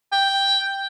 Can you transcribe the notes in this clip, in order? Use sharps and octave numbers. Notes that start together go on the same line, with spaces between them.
G5